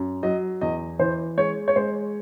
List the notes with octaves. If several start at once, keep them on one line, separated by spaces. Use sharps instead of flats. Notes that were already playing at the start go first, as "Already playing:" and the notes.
Already playing: F#2
F#3 D#5
E2 D#5
E3 C5
G#3 C#5
C#5
G#3 C5